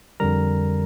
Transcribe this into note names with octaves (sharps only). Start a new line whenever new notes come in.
F2 D3 G3 A#4 A#5